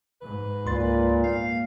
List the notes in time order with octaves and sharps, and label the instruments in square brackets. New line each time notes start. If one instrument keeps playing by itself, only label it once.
[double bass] G#2 [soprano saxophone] B4
[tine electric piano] C#2 C6 A6 [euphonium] A#2
[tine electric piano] A#3 [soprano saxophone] F5